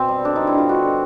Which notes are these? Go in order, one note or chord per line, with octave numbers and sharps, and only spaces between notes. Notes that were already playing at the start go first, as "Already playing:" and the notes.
Already playing: B2 C4
G3
D3 D4
G3 D#4
E4
D3 F4
G3 F#4
D3